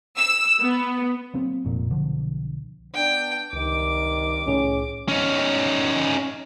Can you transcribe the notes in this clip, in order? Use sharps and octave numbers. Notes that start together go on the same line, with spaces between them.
E6
B3
F#3 A#3 C4
F1 F2 A#2
B1 D3 F3
B3 D4 G5
C#2 G2 C3 D#3 D6
C2 A2 C#4 G#4
C#4 D#4